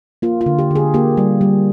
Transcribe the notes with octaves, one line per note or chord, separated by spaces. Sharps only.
A#3 F4
F4
D3
G4
D3 G#4
A#3 G4
G3
G3